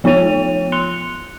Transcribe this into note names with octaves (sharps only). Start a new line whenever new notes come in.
F3 B3 F4 C#5 D#7 F7
C6 F#6 C#7 F7 G7